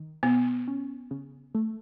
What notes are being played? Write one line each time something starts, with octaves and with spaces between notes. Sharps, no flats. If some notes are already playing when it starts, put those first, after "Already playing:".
Already playing: D#3
B2 B3
C#4
C#3
A3